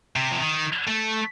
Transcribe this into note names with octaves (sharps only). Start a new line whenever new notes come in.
C3
F3
D#3
A3